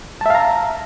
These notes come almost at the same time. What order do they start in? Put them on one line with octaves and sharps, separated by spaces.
A5 E5 F5 A#5